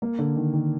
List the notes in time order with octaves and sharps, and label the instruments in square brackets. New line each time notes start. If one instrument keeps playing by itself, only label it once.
[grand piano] A#3
D3
D#3
D#3